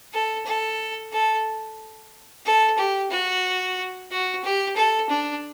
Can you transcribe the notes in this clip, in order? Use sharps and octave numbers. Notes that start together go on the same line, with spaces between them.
A4
A4
A4
A4
G4
F#4
F#4
G4
A4
D4